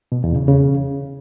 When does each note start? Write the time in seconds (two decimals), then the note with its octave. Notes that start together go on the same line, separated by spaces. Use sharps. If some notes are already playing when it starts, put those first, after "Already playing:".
0.12 B2
0.24 E2
0.36 C#3
0.48 C#3